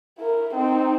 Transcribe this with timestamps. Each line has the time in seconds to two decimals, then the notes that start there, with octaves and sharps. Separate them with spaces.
0.18 E4 A#4
0.54 C4 D#4